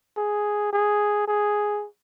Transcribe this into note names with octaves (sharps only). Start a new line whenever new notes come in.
G#4
G#4
G#4